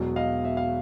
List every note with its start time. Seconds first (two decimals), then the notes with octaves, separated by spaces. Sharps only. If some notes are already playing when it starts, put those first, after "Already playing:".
Already playing: E1 E2 B2 F#3
0.16 D#5 F5
0.45 E5
0.57 F5